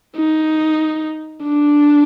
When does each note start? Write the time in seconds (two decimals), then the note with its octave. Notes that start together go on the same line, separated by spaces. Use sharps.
0.17 D#4
1.44 D4